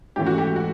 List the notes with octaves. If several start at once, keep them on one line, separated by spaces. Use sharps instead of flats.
G#2 E3 A3 C#4 G4
F#4
G4
F#4